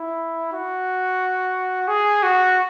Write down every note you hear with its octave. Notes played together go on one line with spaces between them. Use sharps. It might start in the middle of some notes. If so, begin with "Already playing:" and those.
Already playing: E4
F#4
G#4
F#4